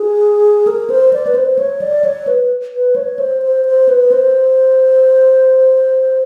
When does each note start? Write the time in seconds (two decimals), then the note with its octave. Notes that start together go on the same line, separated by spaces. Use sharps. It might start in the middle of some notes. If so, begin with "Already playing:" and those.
Already playing: G#4
0.67 A#4
0.90 C5
1.13 D5
1.27 B4
1.35 C5
1.59 C#5
1.81 D5
2.04 C#5
2.27 B4
2.74 B4
2.96 C#5
3.19 C5
3.42 C5
3.66 C5
3.89 B4
4.12 C5